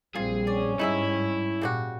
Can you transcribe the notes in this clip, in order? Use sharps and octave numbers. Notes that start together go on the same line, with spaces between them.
A#1 G3 C4 F4 G#4
C#4 D5
G#2 G3 D#4 E4 G#4 E5
A#2 C#3 G3 F#4